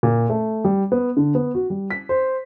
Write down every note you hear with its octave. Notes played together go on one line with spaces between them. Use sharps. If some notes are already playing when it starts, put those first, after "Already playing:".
A#2
A3
G3
B3
D3
B3
F#4
G3
B6
C5